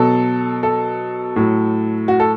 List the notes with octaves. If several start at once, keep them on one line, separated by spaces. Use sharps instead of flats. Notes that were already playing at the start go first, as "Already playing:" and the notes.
Already playing: B2 F#3 A4
A4
A2 F#3
F#4
A4